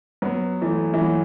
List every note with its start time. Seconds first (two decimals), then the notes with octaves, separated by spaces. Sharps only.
0.22 F#3 B3
0.62 E3 A3
0.94 E3
1.02 F#3